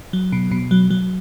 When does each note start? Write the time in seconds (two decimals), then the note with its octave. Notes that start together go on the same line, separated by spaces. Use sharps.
0.13 F#3
0.32 B2
0.51 B2
0.71 F#3
0.91 F#3